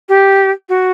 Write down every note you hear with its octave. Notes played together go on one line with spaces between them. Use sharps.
G4
F#4